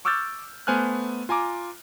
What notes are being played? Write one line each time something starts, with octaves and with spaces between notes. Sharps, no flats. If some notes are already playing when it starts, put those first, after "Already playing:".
C#6 D6 E6 F6 G6 A6
A3 B3 C5 G#5 F6 F#6
F4 G#5 A#5 D6